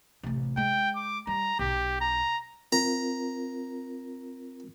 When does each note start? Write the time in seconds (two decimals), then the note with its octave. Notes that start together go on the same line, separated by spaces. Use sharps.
0.23 A1 C3
0.57 G#3 G5
0.96 D6
1.27 G3 A#5
1.59 B1 G4
2.01 A#5
2.72 C4 F4 A#4 A#5